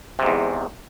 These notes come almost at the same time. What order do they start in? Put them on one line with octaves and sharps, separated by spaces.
C3 G#2 E2